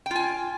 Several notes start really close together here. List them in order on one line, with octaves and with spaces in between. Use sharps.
G5 F4 G#5